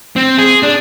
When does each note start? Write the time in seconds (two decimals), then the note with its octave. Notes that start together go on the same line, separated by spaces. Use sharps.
0.16 C4
0.38 G#4
0.63 D4